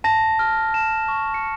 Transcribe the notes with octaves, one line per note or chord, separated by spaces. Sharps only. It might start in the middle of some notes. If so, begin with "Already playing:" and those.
A5 A#6
F6
A5 E7
C#6
C#7